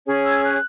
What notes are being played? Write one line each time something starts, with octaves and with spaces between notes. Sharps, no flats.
C#4 G#4 C#5
E6
G#6
F#6